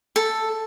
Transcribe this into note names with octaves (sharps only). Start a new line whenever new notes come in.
A4